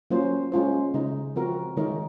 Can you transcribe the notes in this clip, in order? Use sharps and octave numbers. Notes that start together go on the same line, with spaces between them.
F#3 A#3 C#4 F4 C5
G#3 C#4 F4 C5
C#3 G#3 D#4
F3 C4 F#4 A#4
D#3 G#3 D#4 A#4 C#5